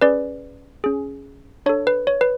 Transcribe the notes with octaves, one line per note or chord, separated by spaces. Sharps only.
C#4 G#4 B4 D5
C#4 G#4
D4 A4 C#5
B4
C#5
B4